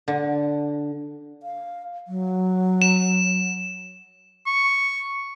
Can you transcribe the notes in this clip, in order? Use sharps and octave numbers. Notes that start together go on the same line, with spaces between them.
D3
F5
F#3
E7
C#6